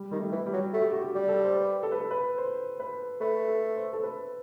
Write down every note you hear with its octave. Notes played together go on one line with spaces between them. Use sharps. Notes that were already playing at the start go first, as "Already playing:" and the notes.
Already playing: G3
D#3 G3
A3
E3
G3
F#3
A3 F#4
G4
F#4
G4
G3
A4
C5
B4
A4
B4
A4
B4
C5
B4
A3 B4
A4
C5
A4
B4